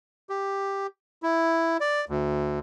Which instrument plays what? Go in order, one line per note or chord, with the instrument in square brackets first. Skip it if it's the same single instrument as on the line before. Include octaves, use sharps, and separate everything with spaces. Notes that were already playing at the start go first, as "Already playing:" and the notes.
[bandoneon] G4
E4
D5
D2